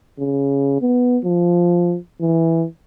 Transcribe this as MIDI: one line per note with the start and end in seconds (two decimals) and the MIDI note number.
0.19 0.80 49
0.81 1.18 59
1.25 1.96 53
2.21 2.65 52